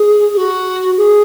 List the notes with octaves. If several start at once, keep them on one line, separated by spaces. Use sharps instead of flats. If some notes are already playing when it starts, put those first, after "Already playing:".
Already playing: G#4
G#4
F#4
G#4